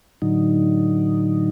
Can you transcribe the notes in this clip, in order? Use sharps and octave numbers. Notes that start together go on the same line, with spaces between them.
A2 D3 F#3 D#4